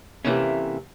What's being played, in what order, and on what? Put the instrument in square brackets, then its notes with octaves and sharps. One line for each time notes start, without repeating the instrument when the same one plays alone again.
[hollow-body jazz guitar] C3 E3 A3 A#3 C#4